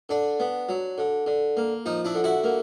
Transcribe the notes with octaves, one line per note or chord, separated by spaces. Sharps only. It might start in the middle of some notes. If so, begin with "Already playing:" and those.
D3 D4
B3
F#3
D3
D3
A#3
F3 D#4
D4 E4
D3
E4 F#4
A#3